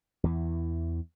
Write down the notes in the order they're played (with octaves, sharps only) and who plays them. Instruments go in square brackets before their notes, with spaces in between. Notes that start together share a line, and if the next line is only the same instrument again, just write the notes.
[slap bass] E2 E3